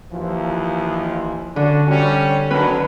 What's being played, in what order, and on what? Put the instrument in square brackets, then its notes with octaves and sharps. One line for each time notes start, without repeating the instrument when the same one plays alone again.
[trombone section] D#2 E3 F3
[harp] D3 [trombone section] C#4 D4 F#4
[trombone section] C3 G3 C#4
[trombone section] D3 D#3 F#3 [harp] C#4 B4